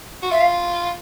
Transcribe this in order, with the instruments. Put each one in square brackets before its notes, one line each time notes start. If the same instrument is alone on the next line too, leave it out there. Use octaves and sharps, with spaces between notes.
[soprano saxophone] F#4
[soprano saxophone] F4 [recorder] E5
[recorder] F5